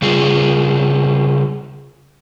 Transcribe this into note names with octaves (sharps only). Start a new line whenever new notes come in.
C#3 G3 F4 G#4